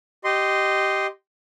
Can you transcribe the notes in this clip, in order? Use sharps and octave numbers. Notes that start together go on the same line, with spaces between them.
G4 D#5 C6